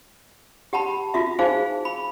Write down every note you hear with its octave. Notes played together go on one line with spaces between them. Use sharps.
G4 F#5 A5 B5
F4 F#4 E5
D#4 G#4 C5 F5 G#5
B5